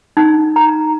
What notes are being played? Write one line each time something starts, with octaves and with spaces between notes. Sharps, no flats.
D#4
A#5